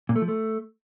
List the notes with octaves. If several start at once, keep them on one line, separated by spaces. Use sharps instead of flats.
A#2
A3
F3
A3